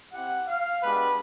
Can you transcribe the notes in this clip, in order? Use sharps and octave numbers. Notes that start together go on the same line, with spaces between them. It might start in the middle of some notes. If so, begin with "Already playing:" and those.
C4 E4 G4 F#5
F5
G#3 B3 D4 G4 B4